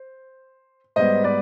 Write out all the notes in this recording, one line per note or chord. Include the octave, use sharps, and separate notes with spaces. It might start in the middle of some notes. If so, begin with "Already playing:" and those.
Already playing: C5
G#2 G3 B3 C5 D#5
B4 D5